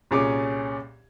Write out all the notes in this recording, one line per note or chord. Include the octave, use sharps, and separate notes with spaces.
C2 A#2 C#4 G#4 D6